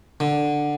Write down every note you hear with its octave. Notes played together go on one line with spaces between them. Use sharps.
D3